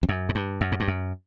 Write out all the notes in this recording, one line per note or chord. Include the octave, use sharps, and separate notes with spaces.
F2
F#2
G#2
G2
F#2
G#2
G2
F#2